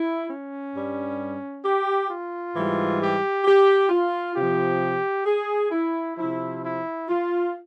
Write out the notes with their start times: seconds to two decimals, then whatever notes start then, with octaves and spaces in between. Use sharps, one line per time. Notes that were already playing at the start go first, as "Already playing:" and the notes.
Already playing: E4
0.28 C#4
0.73 G2 G3
1.63 G4
2.08 F4
2.53 G#2 E3 G3
2.99 G4
3.44 G4
3.89 F4
4.35 C3 F3 G4
5.26 G#4
5.71 E4
6.17 C3 F3 E4
6.62 E4
7.07 F4